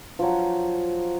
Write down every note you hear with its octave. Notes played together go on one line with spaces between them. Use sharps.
F3 F#3